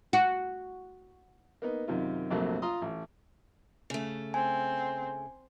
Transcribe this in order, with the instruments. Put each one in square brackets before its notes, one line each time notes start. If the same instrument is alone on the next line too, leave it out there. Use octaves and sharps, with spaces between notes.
[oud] F#4
[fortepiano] A#3 B3 D#4
F#2 C3 D#3 D#4 F4
A#1 F2 C3 F#3 A3 A#3
F4 A#5 C6 D#6
A1
[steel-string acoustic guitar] C#3 A3
[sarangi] C4 [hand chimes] G#5